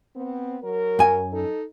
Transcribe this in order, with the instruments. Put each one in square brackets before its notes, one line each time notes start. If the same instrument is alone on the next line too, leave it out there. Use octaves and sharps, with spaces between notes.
[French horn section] B3 C4
F#3 A#4
[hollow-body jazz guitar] F#2 G#5
[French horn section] D#4 A4